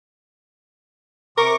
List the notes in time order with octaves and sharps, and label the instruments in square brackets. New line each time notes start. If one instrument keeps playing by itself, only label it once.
[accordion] C3 C#6 D6 [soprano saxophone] A#4